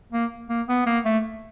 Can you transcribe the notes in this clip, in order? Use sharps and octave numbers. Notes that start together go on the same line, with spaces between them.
A#3
A#3
B3
A#3
A3